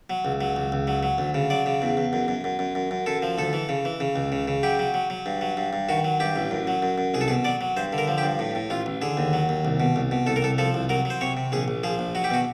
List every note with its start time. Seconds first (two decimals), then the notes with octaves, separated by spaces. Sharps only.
0.10 F#3
0.25 C#2
0.41 F#3
0.56 C#2
0.72 C#2
0.87 F#3
1.03 F#3
1.18 D2
1.34 C#3
1.50 F#3 D5
1.66 C#3
1.82 E2
1.97 E2
2.13 F#2
2.28 F#2
2.44 F#2
2.59 F#2
2.75 F#2
2.91 F#2
3.06 F#2 A4
3.22 F3
3.38 D2 A4
3.53 E3
3.69 C#3
3.85 E3
4.00 C#3
4.16 C#2
4.32 C#3
4.48 C#3
4.63 F#3 G4
4.79 F#3
4.94 F#3
5.10 F#3
5.26 G2
5.41 F#3
5.57 G2
5.73 G2
5.89 D#3 F#4
6.05 F#3
6.20 G2 G4
6.36 A1
6.51 F#2
6.67 F#3
6.83 F#2
6.98 F#2
7.14 C2 G#4
7.21 A4
7.28 B2 G#4
7.45 F#3 D5
7.61 F#3
7.77 G2 C5
7.93 D3
7.98 A#4
8.08 F3
8.18 G4
8.23 G2
8.39 A2
8.55 A2
8.70 A1 F4
8.86 A1
9.02 D3 G#4
9.17 D#2
9.33 F#3
9.49 D#2
9.65 C2
9.80 B2
9.96 C2
10.11 B2
10.26 C2 A4
10.36 A#4
10.42 C2 A4
10.58 F3 A4
10.74 C2
10.89 F#3 A#4
11.05 F#3
11.10 C5
11.21 C3 C#5
11.37 C3
11.52 A#1 G#4
11.68 A#1
11.83 F3 G#4
11.99 A#1
12.15 F#3 F#4
12.24 G4
12.30 B2 F#4